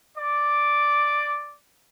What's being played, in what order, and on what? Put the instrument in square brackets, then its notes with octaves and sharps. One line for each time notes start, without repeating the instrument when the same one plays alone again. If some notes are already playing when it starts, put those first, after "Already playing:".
[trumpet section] D5 D6